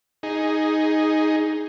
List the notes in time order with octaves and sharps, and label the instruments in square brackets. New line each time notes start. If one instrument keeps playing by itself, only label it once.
[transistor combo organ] D#4 G#4